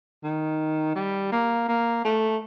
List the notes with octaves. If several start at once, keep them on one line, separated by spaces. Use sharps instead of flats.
D#3
G3
A#3
A#3
A3